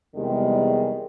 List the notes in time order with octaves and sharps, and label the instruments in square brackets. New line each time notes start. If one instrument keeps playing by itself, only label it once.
[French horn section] E2 C3 D#3 G3 G#3